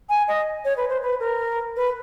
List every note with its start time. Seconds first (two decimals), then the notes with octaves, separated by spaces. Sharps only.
0.10 G#5
0.28 D#5
0.65 C#5
0.77 B4
0.89 C5
1.02 B4
1.20 A#4
1.76 B4